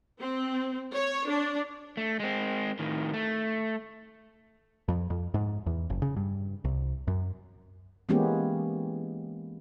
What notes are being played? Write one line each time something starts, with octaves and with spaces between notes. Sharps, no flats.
C4
C#5
D4
A3
G#3 C4
A2 D#3
A3
F2
F2
G#2
E2
F#1
C#3
G2
C2
F#2
E3 G#3 A#3 B3 C#4 G4